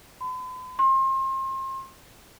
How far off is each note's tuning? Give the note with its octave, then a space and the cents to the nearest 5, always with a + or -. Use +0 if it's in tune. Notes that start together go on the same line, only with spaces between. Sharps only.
B5 +45
C6 +35